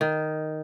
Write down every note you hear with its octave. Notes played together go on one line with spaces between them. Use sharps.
D#3